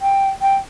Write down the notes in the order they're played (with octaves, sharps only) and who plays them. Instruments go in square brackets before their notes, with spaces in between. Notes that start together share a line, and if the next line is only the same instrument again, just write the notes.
[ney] G5
G5